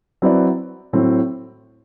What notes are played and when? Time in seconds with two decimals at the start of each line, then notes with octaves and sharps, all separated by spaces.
0.22 F#3 C4 E4 B4 D5
0.93 A2 F#3 C4